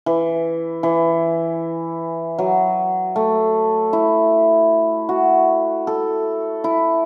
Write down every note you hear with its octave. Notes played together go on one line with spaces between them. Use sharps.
E3
E3
F#3
A3
E4
F#4
A4
E4